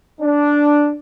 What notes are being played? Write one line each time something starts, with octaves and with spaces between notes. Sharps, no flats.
D4